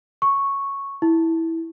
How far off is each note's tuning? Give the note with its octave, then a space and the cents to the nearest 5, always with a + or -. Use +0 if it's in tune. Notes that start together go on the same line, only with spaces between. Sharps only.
C#6 -5
E4 -10